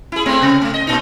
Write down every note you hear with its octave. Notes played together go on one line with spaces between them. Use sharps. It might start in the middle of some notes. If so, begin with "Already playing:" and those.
E4 G#4
G#3 A3 C4
C3
A3
D#5
A#2 D#4